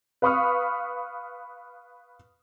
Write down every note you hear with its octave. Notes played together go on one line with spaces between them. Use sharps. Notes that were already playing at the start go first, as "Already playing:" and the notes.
B4 F5 B5 C#6 D#6 F6